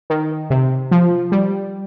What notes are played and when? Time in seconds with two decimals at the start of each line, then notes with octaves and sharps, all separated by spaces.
0.10 D#3
0.50 C3
0.91 F3
1.32 G3